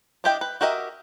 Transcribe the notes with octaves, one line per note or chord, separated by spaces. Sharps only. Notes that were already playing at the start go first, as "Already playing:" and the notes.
D4 E4 G4 D#5 G5
B4
F#4 G4 A#4 D#5 E5